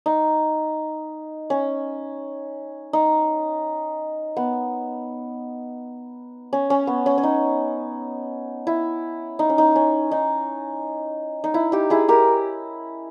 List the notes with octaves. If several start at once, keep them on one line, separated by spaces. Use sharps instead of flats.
D#4
C#4
D#4
B3
C#4
C#4
B3
C#4
C#4
D#4
E4
D#4
C#4
D#4
C#4
D#4
D#4
E4
D#4 G4
E4 G#4
G4 A#4